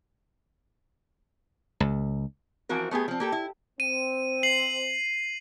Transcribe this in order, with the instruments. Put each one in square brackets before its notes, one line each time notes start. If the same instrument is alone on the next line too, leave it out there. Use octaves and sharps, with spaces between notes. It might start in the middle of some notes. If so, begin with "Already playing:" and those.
[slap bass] C#2
[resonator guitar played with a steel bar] E3 F3 C4 F#4 A#4
A3 B3 G4 G#4
F3 C4
A#3 G4 A4
E4
[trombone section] C4 [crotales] D#7
[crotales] C7 F#7